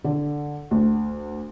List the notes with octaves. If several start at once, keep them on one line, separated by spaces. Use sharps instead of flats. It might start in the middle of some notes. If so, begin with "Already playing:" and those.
D3
D2